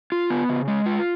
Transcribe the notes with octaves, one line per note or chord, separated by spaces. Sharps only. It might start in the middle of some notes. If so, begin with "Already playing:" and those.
F4
B3
C#3
G#3
F4